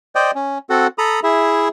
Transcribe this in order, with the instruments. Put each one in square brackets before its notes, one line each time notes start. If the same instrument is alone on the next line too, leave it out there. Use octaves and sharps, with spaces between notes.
[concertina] C5 D5 D#5 G5
C#4
C4 F#4 A4 F#5
A4 A#5 B5 D#6
E4 G#4 E5